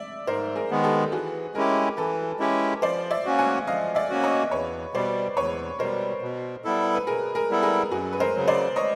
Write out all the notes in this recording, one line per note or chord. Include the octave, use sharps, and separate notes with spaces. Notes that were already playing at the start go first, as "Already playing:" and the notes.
Already playing: D5 E5
G#2 A#4 C5
G#4 A#4
D#3 G#3 B3
G4 A4
E3 F#4 G#4
G#3 C#4 E4 G4 G#4 A#4
E3 A4 B4
G#3 C#4 E4 G4
F3 C5 D5
D5 E5
A#3 C#4 F#4
F#5 G#5
F3 D#5 F5
D5 E5
A#3 C#4 F#4
C#5 D#5
E2 B4 C#5
B2 G3 C5 D5
E2 B4 C#5
B2 G3 A#4 C5
B2
G3 B3 E4 A4
B4
B2 G#4 A#4
G#4 A#4
G3 B3 E4 A4
G#4 A#4
F#2 F#4 G#4
B4
A#4 C5
C#3 F#3
C5 D5
C#5 D#5